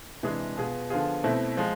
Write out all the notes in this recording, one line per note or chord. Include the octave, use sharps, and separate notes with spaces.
C3 E3 G#3 D4 G#4
B2 B3 F4 G#4
D3 F3 B3 F4 G#4
B2 A3 C4 E4
F3 G#3